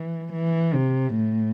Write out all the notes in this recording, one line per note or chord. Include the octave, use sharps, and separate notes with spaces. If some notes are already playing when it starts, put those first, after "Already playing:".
Already playing: E3
E3
C3
A2